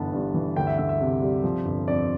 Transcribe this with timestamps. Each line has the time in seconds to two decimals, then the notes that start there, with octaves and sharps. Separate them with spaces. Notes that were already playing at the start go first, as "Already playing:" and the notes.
Already playing: G1 E3 B3 A5
0.13 G2
0.34 E3
0.56 D2 G5
0.67 E5
0.78 D2 E5
0.89 E5
1.01 C3
1.22 G3
1.44 F3
1.65 G1
1.88 F2 D5